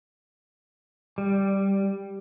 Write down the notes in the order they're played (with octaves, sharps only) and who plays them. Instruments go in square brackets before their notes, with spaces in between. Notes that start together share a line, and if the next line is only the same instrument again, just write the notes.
[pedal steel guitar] G3